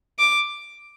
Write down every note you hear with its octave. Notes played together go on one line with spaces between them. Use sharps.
D6